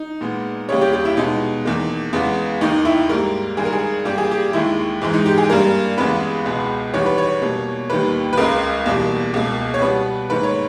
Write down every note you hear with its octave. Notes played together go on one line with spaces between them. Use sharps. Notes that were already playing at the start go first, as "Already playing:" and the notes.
Already playing: D#4
A#2 G#3 B3
D#2 C#3 G3 C#5
G4
G4
E4
B2 G#3 B3 D#4
E2 D#3 A#3
E2 C#3 G#3 B3
D#2 D#3 A#3 D#4
E4
G#2 G3 A#3 A#4
G2 D#3 G#3 G#4
A#4
G#4
G2 G3 A#3 G4
G#4
G4
D#2 D#3 G#3 E4
G#2 E3 G#3
D#4
G4
G#4
G2 G3 A#3 A#4
E2 C#3 G#3 B3 B4
C#2 B2 G#3 B3
E2 D#3 G3 B3 C#5
B4
C#5
B2 G3 A#3
D#2 D#3 G3 A#3 B4
B4
C#2 C#3 G#3 A#4
E2 B2 G3 A#3
C#2 B2 A#3
C#5
B2 G3 B3 B4
G#2 D#3 A#3 B4
C#5